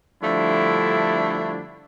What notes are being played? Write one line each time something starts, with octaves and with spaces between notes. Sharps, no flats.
D3 F3 G3 A3 D4 E4